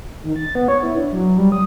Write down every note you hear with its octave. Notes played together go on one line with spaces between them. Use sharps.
D#3
A6
B3
C#5
E4
D4
F#3
G3
D#6